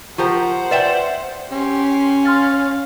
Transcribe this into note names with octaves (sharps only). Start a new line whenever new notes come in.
F3 F4 G4 A#4 C5 F#5 C#6
B4 D5 E5 G5 E7
C#4 G4 C6
F5 C6 F6 A6